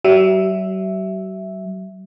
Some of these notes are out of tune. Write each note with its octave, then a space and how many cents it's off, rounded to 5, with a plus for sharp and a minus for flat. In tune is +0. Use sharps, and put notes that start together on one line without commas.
F#3 +45 E5 +0